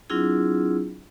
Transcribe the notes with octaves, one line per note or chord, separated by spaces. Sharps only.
F#3 C4 D4 E4 F4 G#4